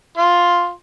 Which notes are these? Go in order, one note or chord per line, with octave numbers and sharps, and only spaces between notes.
F4 C6